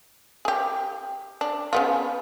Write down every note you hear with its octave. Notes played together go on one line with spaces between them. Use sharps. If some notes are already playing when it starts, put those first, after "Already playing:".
G4 G#4
D4
C#3 B3 F4